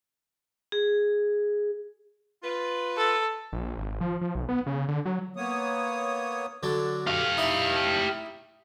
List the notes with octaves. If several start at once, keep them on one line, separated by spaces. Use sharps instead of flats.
G#4
F4 B4
A4
A#1
G#1
F3
F3
B1
B3
C#3
D3
F#3
A#3 B3 C#5 D#6
D3 F#3 D4
G4 F5
D#4 E4 D#5